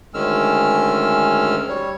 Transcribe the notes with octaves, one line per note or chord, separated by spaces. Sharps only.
D2 D#3 G#3 C#4 E6 F6
G3 C#5